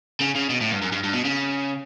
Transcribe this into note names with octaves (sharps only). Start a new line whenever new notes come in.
C#3
C#3
B2
A2
G2
F#2
G2
G2
B2
C#3